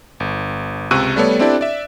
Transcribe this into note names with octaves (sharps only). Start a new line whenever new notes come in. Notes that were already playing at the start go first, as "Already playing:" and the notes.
G1
C#2 C3 C#6 E6 F#6 D#7
G3 A3 B3 A4 C#5 D5
C4 D4 E4 G4 A4 D5
D5 E5